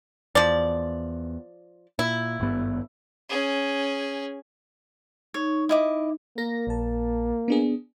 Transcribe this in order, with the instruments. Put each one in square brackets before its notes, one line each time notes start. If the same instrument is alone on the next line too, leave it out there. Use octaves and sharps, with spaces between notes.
[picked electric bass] E2 [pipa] F3 D5
[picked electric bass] A#2 [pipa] E4
[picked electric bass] G#1 G2 B3
[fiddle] C#4 G#4
[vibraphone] D#4 [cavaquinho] C#5
[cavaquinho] E4 D#5 D6
[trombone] A#3 [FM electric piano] A#4 A#6
[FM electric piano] A#1 A5
B3 D4 G#4